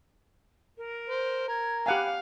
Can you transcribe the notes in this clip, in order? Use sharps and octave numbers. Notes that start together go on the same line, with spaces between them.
A#4
C5
A#4 G#6
G4 F5 F#5 G#5 B5